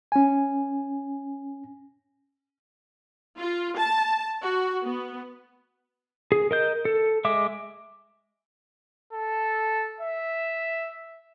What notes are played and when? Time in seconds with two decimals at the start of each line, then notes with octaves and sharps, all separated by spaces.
0.12 C#4 G#5
3.37 F4
3.76 A5
4.42 F#4
4.83 B3
6.32 G#4
6.51 A#4 D#5 G6
6.85 A4
7.25 G#3 E5 D6
9.13 A4
10.01 E5